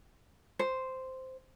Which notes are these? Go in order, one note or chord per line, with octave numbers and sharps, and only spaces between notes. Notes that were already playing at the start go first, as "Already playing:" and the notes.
C5